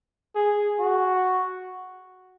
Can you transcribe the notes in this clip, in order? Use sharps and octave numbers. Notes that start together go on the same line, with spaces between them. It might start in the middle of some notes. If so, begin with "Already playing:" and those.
G#4
F#4